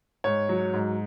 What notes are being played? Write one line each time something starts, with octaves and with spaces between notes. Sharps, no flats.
G#2 C#5
F#3
G#2